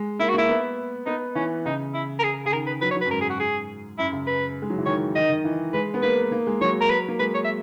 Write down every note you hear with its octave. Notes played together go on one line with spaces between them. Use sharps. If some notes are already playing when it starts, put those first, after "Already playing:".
Already playing: G#3
A#3 E4
F#4
A#3 E4
B3
B3 D#4
E3 C#4
C#3 D#4
E4
A#4
G#4
C#3 G#4
D#3 A#4
B4
F#3 B4
C#5
F#3
B4
F#2
G#2 A#4
G#4
F#4
G#4
F#2 E4
C#3
B4
G#3
F#3
E3
D#3 C#5
D#3 D#5
D#3
E3
G#3 B4
B3
A#3 B4
A#3
G#3
F#3 C#5
A#4
B4
A#3
G#3 B4
C#5
E5